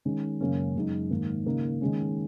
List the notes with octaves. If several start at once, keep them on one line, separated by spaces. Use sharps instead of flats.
D#3 G#3 C#4
F#2 C#3 A#3 C#4
F#2 C#3 G#3 D#4
G#2 D#3 A#3
C#3 A#3 D#4
D#3 G#3 C#4